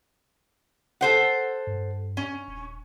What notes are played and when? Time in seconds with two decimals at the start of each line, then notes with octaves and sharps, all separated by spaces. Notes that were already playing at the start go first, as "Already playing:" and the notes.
1.01 A4 C5 F#5
1.67 G2
2.17 C#4
2.48 D#1